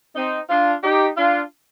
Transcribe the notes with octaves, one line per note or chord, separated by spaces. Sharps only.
C4 D#4
D4 F4
D#4 G4
D4 F4